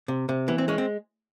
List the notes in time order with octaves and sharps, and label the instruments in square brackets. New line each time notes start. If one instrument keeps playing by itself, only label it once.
[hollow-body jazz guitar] C3
C3
E3 B3
C4
G#3 C#4
C4